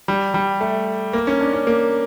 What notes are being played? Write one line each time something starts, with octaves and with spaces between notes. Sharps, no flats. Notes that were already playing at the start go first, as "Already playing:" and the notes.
G3
G3
A3
A#3
C#4
D4
C#4
A#3